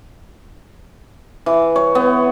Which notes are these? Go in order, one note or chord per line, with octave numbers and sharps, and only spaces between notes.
E3
C#5
B3